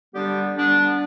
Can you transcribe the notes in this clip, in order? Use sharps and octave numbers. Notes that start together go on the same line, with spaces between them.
D3 G3 B3 D4 G4
D3 G3 B3 D4